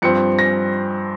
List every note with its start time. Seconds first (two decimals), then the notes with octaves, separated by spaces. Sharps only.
0.02 G2 F3 C4 C#7
0.39 A#6